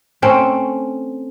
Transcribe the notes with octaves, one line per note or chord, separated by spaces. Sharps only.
A3 C4 C#4